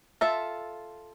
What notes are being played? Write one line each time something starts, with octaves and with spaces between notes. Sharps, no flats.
F4 A4 E5